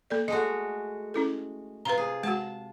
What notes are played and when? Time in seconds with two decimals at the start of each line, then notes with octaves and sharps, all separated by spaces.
0.10 A#3 A4 D5
0.28 G#3 A3 F#4 D#5
1.14 C#4 E4 A4
1.85 C3 F4 B4 A#5
1.98 G#4
2.23 G#3 F#4 A5